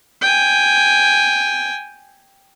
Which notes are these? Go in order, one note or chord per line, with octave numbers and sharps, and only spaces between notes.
G5 G#5